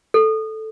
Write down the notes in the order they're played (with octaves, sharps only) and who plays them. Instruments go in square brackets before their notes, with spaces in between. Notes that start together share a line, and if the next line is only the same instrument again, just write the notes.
[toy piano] A4